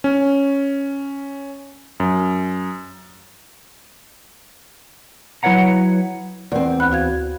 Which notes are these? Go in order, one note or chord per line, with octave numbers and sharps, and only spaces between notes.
C#4
F#2
F#3 E4 B4 C#5 F#5 A#5
E2 C4 D5
D2 B5 F#6
F#4 F5 G#6